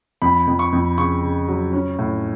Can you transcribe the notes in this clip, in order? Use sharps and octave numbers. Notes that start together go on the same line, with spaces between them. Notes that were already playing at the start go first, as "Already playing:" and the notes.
F2 B5
F2
C#6
F2
C#3 C#6
C#3
F#3
C#4
A2